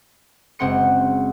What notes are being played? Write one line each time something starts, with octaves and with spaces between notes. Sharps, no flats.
F#1 G#3 C4 F#5 C6 C#7